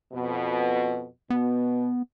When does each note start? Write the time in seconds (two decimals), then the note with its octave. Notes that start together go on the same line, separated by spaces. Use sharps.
0.13 F2 B2
1.30 B2 B3